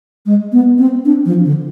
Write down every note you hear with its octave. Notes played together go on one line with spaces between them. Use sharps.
G#3
B3
C4
D4
F3
D3